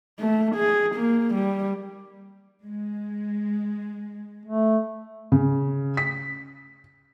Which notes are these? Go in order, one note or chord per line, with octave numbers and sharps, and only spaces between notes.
A3
G#4
A#3
G3
G#3
A3
C#3
B6